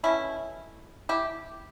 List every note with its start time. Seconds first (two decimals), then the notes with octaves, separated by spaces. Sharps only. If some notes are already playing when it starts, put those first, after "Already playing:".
0.03 B2 F#3 A3 C#4 E4
1.09 E4 G4